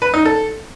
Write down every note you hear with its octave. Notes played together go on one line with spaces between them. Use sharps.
B4
D#4
A4